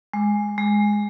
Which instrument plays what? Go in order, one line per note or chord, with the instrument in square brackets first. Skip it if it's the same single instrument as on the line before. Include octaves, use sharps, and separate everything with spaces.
[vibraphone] G#3
G#3